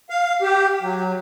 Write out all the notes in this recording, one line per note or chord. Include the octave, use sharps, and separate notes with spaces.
F5
G4
F#3